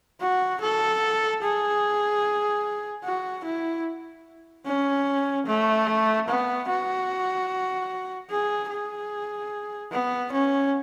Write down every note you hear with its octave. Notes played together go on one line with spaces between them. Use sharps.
F#4
A4
G#4
F#4
E4
C#4
A3
B3
F#4
G#4
G#4
B3
C#4